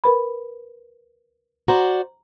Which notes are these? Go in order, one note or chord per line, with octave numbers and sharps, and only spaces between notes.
A#4 B4 B5
F#4 C5 D5 A#5